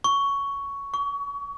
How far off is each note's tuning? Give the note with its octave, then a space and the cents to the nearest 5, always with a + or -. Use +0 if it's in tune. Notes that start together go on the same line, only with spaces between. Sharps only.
C#6 +10
C#6 +30